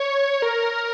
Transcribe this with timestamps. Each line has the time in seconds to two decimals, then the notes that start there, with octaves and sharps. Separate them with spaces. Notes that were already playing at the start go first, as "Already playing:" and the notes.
Already playing: C#5
0.42 A#4